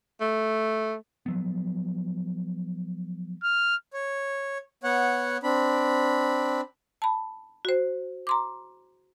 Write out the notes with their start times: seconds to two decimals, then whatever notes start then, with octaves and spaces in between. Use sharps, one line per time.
0.21 A3
1.26 F3 F#3 B3
3.43 F6
3.93 C#5
4.83 B3 C#5 F#5
5.43 C4 D4 B5
7.02 A5 B5
7.65 F#4 C5
8.27 A#5 C6 D6